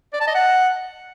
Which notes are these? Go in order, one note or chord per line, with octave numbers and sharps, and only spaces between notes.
D5
A5
D#5
F#5